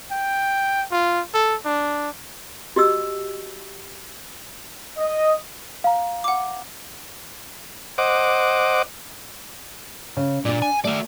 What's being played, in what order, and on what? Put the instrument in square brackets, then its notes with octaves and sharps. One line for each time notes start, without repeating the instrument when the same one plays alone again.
[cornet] G5
F4
A4
D4
[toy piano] F#4 G4 D#5 E6
[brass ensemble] D#5
[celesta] F5 A#5
[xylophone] F#5 D6
[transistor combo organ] C5 D#5 F#5 D6
[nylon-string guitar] C#3
[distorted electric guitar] A#2 [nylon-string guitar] D4 D5
[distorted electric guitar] G#5
[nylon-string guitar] A3 [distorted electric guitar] F#4 D5